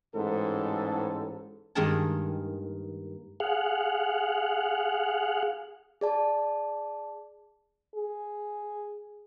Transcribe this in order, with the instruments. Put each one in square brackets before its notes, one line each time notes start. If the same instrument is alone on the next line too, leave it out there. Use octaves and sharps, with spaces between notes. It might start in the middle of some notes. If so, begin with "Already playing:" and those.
[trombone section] A1 G#2 A4
[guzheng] G2 D#3 G#3 A#3 G#4 A5
[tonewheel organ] G#4 F5 F#5
[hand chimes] G#4 D5 A5
[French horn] G#4